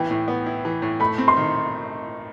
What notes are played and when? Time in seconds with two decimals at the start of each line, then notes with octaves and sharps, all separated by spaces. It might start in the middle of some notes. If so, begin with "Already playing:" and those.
Already playing: A2 E3 B3 E4 G5
0.11 A2
0.28 B3
0.46 E4
0.65 E3
0.82 A2
1.00 A3 B5
1.18 C4
1.28 C6
1.36 D#3